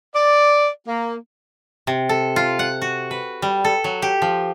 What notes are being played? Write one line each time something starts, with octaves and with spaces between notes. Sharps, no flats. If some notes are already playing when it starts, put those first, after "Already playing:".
D5
A#3
C3
A4
F4
F#5
F#4
B4
G3
A4
F#3
G4
F3